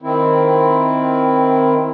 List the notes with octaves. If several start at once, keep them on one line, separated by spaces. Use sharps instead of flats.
D#3 C4 E4